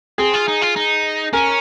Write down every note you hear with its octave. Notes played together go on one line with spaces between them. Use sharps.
C4 G#4
F4
D#4
F4
D#4
C#4 A#4